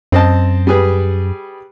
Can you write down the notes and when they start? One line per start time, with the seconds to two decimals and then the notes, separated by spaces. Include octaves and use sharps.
0.12 F#2 C4 D#5 A5
0.67 G3 G#4 B4